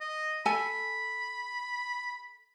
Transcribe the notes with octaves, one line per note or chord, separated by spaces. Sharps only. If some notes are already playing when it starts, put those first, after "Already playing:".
D#5
A4 G#5 B5